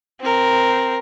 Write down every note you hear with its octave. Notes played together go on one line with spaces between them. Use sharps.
C4 A#4